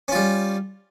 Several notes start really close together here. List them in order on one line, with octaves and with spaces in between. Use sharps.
C#4 F4 G3